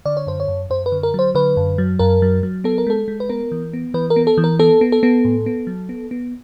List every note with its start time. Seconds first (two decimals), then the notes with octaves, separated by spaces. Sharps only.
0.05 D3 D5
0.17 C#5
0.27 F#2 C5
0.40 C#5
0.48 F#2
0.70 F#2 C5
0.86 B4
0.92 D3
1.03 A#4
1.14 F#3 C5
1.35 D3 B4
1.57 F#2
1.78 F#3
1.99 F#2 A#4
2.22 F#3
2.43 F#3
2.64 B3 A4
2.78 A#4
2.87 G#3 A4
3.08 G#3
3.20 B4
3.29 B3 A#4
3.52 E3
3.73 B3
3.94 E3 B4
4.10 A#4
4.16 B3
4.27 A4
4.38 E3
4.44 A#4
4.59 B3 A4
4.81 B3
4.92 A4
5.03 B3
5.25 A2
5.46 B3
5.67 F#3
5.89 B3
6.11 B3